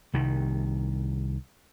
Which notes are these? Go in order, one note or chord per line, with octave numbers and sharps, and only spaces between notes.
C2 D#3